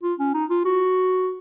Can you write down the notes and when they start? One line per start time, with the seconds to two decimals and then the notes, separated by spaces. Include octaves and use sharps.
0.03 F4
0.19 C#4
0.34 D#4
0.50 F4
0.65 F#4